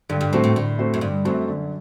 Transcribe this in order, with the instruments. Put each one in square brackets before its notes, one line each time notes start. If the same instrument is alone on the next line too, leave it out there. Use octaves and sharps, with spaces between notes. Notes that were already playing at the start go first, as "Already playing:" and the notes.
[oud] G2 [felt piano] D3
[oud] G2
[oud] A2 [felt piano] A3 C4 F#4 C5
[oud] A2
[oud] A2 [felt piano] D3
[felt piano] A3 C4 F#4 C5
[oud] F#2
[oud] G2 [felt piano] D3
[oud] F#2 [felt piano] A3 C4 F#4 C5
[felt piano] D3